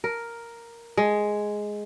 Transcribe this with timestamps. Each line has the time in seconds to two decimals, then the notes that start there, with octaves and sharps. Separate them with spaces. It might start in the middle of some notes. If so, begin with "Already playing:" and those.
0.04 A#4
0.97 G#3